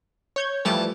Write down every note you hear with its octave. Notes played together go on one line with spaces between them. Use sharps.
C#5 G6 G#6
E3 F3 G3 A3 A5 D6